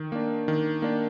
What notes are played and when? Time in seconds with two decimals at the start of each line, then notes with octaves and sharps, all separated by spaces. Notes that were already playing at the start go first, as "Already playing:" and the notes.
Already playing: D#3
0.12 A#3 D4
0.48 D#3
0.82 A#3 D4